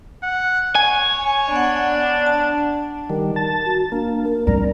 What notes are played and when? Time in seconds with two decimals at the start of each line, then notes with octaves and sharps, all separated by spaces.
0.23 F#5
0.75 C#5 G#5
1.52 B3 D4 F#5
2.26 A5
3.10 D#3 G3 A#4
3.36 A5
3.65 F#4
3.92 A#3 D4
4.23 A#4
4.47 G3 C4 A#4 D5